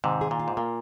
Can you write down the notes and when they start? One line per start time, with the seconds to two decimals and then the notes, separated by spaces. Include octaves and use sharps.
0.04 G#2 C3 D#3
0.21 G#4
0.31 A#2
0.39 F4
0.48 G#2
0.57 A#2 A#3